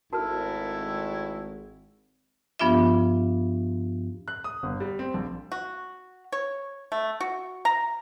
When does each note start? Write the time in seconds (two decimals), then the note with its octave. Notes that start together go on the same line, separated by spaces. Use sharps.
0.13 G#1 G#3 A3 E4 F#4 A#4 A5 F6
2.59 G2 F3 B3 D4 F4 E5
4.28 F#6
4.44 D#6
4.63 G1
4.80 G3
4.99 C4
5.14 A#1
5.52 F#4
6.32 C#5
6.92 A3
7.21 F#4
7.65 A#5